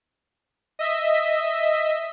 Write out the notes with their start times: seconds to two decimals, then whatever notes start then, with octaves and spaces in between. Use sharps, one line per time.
0.79 D#5 E5 B6